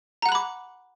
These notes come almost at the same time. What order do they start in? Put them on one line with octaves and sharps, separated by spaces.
A#5 F#5 F#6 B5 D6